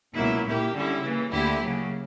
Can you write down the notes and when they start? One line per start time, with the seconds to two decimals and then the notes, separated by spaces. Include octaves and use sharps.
0.15 C#2 B2 F#3 A#3 E4
0.44 A#2 A#3 E4 G4
0.74 D3 G3 C#4 E4
1.02 C#3 E3 A#3
1.30 D2 D3 A#3 E4 G4
1.60 C#3 F#3 A#3